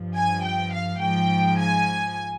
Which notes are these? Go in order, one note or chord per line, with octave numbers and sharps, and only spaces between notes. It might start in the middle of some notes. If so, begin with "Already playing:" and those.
Already playing: G2 F3
G#5
G5
F5
G#2 F3 G5
G#5